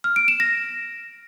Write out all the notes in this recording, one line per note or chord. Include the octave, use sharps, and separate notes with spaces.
F6
D7
E7
A#6